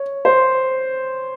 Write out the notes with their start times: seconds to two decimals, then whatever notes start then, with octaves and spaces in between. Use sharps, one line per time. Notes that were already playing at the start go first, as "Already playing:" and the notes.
Already playing: C#5
0.25 C5